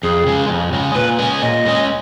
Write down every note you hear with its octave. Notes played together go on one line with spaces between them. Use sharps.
F2 G#4
C#3 G#3
F2
C#3 G#3
A#2 B4
G#3 C#4 G#4
A#2 D#5
G#3 C#4 G#4